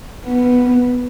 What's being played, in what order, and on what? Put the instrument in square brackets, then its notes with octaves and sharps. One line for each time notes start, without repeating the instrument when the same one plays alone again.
[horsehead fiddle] B3